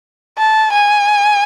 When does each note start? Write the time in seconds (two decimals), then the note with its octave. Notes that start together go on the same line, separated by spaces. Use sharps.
0.37 A5
0.72 G#5